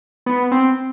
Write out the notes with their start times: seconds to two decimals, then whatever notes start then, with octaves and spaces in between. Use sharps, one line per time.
0.26 B3
0.52 C4